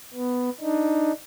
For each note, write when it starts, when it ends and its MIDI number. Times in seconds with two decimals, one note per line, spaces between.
0.14 0.50 59
0.61 1.12 62
0.61 1.12 63